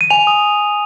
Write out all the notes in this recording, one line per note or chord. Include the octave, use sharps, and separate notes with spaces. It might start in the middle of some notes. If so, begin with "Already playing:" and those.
D#7
G#5 F7
D#6